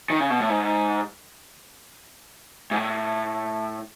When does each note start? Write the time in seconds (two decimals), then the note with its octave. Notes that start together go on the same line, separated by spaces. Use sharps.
0.10 D#3
0.20 C#3
0.30 B2
0.40 A2
0.49 G#2
2.71 G#2
2.76 A2